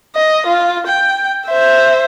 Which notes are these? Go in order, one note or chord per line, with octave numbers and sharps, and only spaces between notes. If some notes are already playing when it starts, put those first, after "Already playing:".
D#5
F4
G5
C5 E5